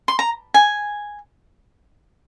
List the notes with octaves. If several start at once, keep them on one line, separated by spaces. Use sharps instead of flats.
C6
A#5
G#5